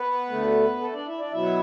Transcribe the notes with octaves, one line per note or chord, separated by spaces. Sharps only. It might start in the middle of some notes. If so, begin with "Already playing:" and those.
Already playing: B3 B4
D2 D3 A3
A3 A4
D4 D5
E4 E5
D4 D5
B2 F#3 B3 E4 E5